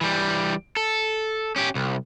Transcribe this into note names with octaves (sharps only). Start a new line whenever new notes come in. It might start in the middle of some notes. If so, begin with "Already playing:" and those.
E3 G3
A4
C#4 G4
C2